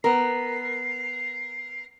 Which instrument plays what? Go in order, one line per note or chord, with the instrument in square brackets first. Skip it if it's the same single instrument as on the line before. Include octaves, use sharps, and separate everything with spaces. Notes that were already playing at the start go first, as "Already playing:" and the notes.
[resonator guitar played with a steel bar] B3 A#4 [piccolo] C7